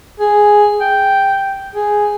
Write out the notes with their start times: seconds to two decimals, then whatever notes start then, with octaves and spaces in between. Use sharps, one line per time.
0.19 G#4
0.80 G5
1.75 G#4